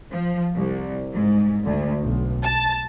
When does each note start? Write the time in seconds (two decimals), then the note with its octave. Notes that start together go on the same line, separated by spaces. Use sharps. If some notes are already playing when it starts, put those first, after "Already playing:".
0.12 F3
0.55 C2
1.13 G#2
1.64 D2
2.02 B1
2.43 A5